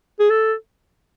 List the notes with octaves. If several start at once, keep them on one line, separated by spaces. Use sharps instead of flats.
G#4
A4